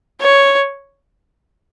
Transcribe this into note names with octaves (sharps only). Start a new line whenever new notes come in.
C#5